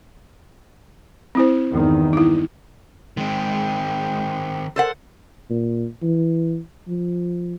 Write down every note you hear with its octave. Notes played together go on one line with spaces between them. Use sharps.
C4 E4 C5
E2 G2 D#3
D#4 E4
D#3 G#3 C4 G5
A4 A#4 C5 F#5
A#2
E3
F3